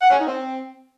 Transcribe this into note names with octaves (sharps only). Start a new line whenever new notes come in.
F#5
C#4
D#4
C4